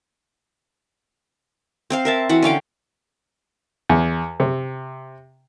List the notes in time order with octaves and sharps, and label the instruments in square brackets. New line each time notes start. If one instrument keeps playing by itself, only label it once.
[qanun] C4 C5 F5
A#4 E5 A5
E3 F#4 F#5
D3 C#4 F5 G5
[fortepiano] E2
C3